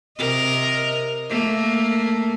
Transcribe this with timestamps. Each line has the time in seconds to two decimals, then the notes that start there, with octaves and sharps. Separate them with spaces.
0.18 C3 A#4 D#5
1.30 A3 A#3